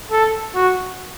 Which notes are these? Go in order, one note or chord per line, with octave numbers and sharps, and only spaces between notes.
A4
F#4